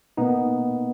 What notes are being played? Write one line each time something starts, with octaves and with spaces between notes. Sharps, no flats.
B2 A#3 B3 D#4